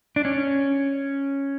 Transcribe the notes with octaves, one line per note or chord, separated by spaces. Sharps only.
D4
C#4